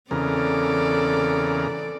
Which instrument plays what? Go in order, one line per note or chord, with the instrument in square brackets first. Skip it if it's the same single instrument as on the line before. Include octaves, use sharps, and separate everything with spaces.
[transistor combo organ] E2 C#3 A#4 [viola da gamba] C4 A4 D5